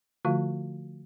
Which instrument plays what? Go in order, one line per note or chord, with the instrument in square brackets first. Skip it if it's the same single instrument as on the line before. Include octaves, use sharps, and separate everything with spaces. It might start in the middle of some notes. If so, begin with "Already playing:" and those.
[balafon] D3 F3 A3 F4 F#4 F5